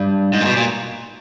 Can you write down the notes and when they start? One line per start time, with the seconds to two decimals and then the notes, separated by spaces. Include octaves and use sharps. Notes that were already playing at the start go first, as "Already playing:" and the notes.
Already playing: G2
0.33 G#2
0.41 A#2
0.45 B2
0.57 A#2